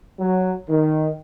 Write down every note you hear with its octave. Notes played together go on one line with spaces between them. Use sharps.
F#3
D#3